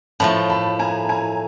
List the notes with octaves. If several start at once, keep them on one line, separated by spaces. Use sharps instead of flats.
A2 F3 A3 A5 B5
A5 B5
G#5 A#5
G#5 A#5